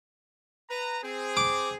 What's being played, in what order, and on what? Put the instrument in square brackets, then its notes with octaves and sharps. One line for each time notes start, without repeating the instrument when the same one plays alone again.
[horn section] B4 A#5
C4 G#4
[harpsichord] D6